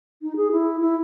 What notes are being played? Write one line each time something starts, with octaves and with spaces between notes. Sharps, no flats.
D#4
G#4
E4
E4